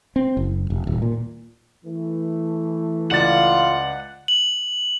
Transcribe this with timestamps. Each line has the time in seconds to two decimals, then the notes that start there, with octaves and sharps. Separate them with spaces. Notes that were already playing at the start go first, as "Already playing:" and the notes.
0.16 C4
0.37 F#1
0.70 F1
0.87 D#1
1.02 A#2
1.85 E3 A3
3.11 C#2 F4 D5 F#5 A6
4.28 F#7